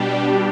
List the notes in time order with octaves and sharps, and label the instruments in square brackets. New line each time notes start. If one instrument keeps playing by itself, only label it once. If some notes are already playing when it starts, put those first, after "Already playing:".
Already playing: [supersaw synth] B2 G3 D4 G4